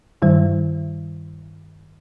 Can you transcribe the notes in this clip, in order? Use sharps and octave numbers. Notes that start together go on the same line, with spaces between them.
G2 D#3 G3